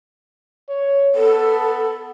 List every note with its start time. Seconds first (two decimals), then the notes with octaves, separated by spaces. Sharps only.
0.69 C#5
1.15 B3 A4